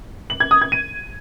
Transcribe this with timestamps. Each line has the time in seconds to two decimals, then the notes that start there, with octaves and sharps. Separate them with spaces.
0.30 F#7
0.40 G#6
0.51 D#6
0.62 G#6
0.72 D#7